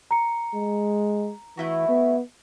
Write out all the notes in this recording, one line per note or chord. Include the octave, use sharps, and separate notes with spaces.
A#5 C#7
G#3
E3 A3 E4 F#4
B3